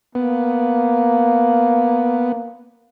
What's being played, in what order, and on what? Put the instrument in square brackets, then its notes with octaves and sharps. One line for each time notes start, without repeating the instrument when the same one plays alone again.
[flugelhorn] A#3 [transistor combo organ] B3